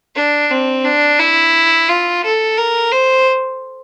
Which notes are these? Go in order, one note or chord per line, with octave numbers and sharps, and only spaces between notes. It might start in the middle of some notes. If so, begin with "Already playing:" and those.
D4
C4
D4
E4
F4
A4
A#4
C5